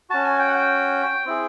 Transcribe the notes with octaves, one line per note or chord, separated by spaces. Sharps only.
C#4 F#4 A5
G#5
G5
F#5
G5
C4 E4 G#4